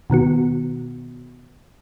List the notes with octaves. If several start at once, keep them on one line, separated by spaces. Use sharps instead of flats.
B2 D#3 B3 F#4